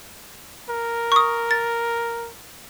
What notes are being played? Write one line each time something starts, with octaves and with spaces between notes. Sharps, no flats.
A#4
C#6 D#6
A6